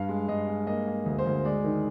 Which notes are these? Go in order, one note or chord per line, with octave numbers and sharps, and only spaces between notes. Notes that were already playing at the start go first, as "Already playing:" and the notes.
Already playing: G2 F5
G#3
G2 D#5
G#3
A#3 D#5
A#3
D2
C5
D2
G#3 D5
D#3